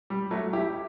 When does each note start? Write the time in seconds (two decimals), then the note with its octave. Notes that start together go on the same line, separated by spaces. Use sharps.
0.10 G3
0.31 F#3 A3
0.53 E4 G4